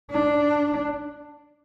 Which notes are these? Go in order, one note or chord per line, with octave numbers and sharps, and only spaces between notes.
D4